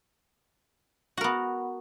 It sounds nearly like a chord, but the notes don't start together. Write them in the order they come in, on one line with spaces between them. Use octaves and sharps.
F#4 A#4 B3